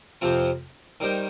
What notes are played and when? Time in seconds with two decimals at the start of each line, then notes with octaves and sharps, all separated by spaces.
0.21 F2 C3 F3 C4 F4
1.00 D#3 G3 D#4 C5